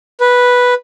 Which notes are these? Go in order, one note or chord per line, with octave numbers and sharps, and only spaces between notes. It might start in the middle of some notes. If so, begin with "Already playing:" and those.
B4